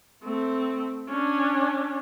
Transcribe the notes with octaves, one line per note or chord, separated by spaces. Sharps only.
A3 C4
C#4 D4